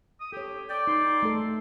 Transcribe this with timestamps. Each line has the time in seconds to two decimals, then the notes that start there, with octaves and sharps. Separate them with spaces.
0.21 D#6
0.33 G4 A4 C#5
0.69 D5 G5
0.87 D#4 C6
1.23 A3 A4